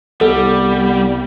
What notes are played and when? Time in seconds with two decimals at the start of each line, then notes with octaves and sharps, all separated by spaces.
0.21 C2 G3 B3 A4